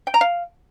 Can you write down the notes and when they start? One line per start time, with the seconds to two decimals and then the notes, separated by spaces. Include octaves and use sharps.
0.07 G5
0.14 A#5
0.21 F5